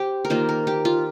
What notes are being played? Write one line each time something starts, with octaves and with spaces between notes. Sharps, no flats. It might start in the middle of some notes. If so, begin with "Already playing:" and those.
Already playing: G4 C5
A#4
D#3 A#3 F4 C5
A#4
G4
F4